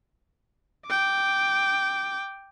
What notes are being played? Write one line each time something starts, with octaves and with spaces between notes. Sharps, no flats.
G5 D6